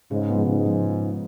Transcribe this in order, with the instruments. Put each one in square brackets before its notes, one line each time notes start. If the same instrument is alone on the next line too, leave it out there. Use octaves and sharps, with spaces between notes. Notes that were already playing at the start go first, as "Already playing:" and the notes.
[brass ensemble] G#2 [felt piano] C#3
[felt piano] F3 G#3 B3
[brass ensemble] G#2 [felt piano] C#3
[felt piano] F3 G#3